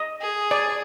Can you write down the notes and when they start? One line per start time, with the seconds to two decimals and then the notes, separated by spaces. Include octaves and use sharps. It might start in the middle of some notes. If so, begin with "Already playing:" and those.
Already playing: D#5
0.22 G#4
0.51 D5